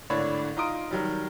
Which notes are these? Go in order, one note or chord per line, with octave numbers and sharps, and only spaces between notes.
G#1 A2 D3 D4 C#5 B5
D#4 F4 A#5 C6 D#6 D7
D#3 F#3 G3